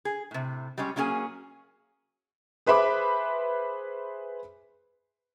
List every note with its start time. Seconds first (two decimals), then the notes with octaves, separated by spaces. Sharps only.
0.05 G#4
0.31 A2 C3
0.78 G3 G#3 C#4 C#5
0.96 F#3 A#3 C#4 G#4 G#5
2.66 G#4 B4 C5 E5 B5 D6